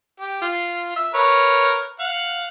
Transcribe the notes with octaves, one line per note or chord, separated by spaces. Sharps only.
G4
F4
E5
A#4 B4 C#5
F5 F#5